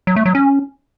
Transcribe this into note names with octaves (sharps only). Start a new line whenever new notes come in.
F#3
A3
F#3
C#4